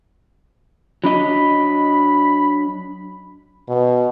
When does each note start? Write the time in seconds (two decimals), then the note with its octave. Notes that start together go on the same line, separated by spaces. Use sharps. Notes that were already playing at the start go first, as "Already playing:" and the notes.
1.04 F#3 D4 D#5 B5
3.69 B2